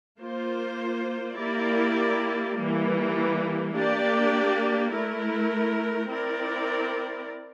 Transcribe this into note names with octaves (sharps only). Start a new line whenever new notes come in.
A#3 F4 C5
A#3 E4 G4 A#4 D5
E3 G3 A#3
A#3 D4 G4 D5
A3 E4 A#4
C4 E4 A#4 D5